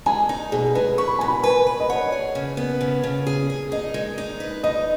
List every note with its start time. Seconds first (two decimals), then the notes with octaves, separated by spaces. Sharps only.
0.06 G#3 G#5
0.29 D#4
0.52 B2 G#4
0.75 G#3 B4
0.98 B4 C#6
1.08 B5
1.19 B2 G#5
1.28 B5
1.44 B4 G#5
1.67 B4
1.80 D#5
1.89 C#5 F#5
2.12 G#4
2.35 C#3
2.57 B3
2.81 C#3
3.03 C#3
3.27 G#4
3.50 G#4
3.72 D#4 D#5
3.94 G#3
4.18 D#4
4.40 B4
4.63 D#4 D#5